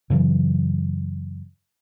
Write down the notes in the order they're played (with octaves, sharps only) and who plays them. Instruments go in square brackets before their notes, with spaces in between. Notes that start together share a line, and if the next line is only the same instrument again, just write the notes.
[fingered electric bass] F#2 C#3 E3 F#3